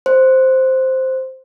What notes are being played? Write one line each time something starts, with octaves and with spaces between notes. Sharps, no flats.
C5